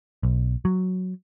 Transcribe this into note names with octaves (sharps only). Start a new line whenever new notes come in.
B1
F#3